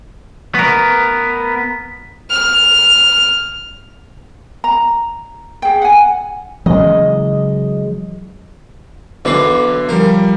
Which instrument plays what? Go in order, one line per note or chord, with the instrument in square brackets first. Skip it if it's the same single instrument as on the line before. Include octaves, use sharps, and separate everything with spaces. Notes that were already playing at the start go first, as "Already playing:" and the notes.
[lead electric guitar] B3 A#4
[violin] F6
[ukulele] A#5
G#4 G5
F#5 G#5
[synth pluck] C#3 E3 D#5 [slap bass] F#3 G#3
[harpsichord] B1 E3 B4 [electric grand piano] D3 C7
[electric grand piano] F3 G3 [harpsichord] A#4